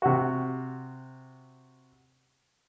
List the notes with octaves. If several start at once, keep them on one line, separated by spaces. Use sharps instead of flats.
C3 F#4